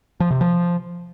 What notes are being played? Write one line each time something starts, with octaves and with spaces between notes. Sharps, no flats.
F3
C3
F3